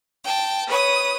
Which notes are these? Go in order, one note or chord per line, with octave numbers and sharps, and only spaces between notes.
G5 A5
B4 C#5 D#6